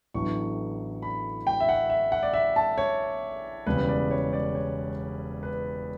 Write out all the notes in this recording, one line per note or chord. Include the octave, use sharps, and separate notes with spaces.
A1 A2 F#3 B3 D4 C#6
B5
G5
E5
F#5
E5
F#5
D5
E5
A5
C#5
E1 E2 C#3 G3 B4
D5
C#5
D5
C#5
B4